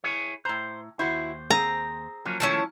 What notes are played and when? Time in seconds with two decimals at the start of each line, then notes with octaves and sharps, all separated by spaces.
0.04 E4 G#4 C#5
0.45 A2 C5 A#5
0.99 D#2 E4 F#4 C5
1.50 C4 G#4 A#5
2.25 F3 F#3 A#3 C#4
2.40 D#3 G#3 A3 C#4 E4 A5